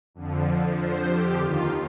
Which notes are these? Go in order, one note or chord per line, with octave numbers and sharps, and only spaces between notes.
F2 D3 F3
C5
G4
D#2 D#3 F4